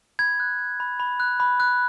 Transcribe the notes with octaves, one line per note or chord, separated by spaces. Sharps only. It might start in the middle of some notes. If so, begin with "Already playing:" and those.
B5 G#6
F#6
F#6
B5
B5
F#6
B5
F#6